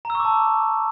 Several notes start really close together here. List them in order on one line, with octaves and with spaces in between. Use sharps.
A#5 E6 C#6 D6 A5